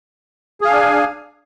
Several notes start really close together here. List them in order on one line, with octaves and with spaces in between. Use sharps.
G#4 F5 D4 G#5